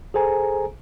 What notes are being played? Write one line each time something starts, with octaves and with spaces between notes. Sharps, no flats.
G#4 A4 C5 G#5 A#5